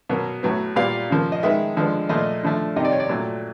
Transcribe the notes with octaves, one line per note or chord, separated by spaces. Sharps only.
B2 F#3 A#3
A2 F#3 B3
A#2 G3 B3 F5
C#3 F3 A#3
D#5
D#3 G#3 B3 E5
D3 F3 G#3 B3
A#2 F3 A3 D#5
D3 F3 A3
C3 D#3 G3 A#3 D#5
D5
C#5
D5
A#2 F#3 A3